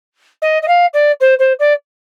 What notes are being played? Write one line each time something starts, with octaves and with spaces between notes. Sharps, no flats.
D#5
D#5
F5
D5
C5
C5
D5